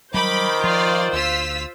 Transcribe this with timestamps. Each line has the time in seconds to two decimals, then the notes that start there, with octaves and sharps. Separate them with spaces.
0.14 D#3 F#3 G3 C5 B5 D6 G6
0.64 F3 F4 D5
1.13 D2 F4 E6 B6